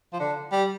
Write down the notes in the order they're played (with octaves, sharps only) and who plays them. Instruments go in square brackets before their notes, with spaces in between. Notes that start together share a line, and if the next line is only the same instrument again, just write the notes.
[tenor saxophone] F3
D3
G3